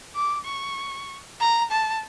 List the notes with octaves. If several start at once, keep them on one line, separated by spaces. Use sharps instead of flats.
D6
C#6
A#5
A5